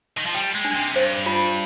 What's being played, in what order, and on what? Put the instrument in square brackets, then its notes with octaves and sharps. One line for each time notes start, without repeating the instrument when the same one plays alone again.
[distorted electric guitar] D#3
F3
[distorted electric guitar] G3 [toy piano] G5
[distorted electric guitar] G#3
[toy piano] D4
[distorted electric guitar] C3
[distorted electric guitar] G2 [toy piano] C5
[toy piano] F4